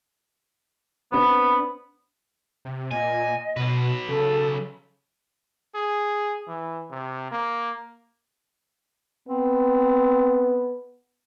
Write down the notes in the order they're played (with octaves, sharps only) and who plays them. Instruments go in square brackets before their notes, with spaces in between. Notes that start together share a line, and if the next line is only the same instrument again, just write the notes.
[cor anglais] B3 [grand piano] C4 D4 B4 [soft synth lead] B5
[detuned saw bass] C3
[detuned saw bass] A#2 [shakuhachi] D#5 [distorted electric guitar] G#5
[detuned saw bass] B2 [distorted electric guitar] F#3 B4
[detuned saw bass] C#3 [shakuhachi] A4
[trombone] G#4
E3
C3
A#3
[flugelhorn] B3 [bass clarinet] C4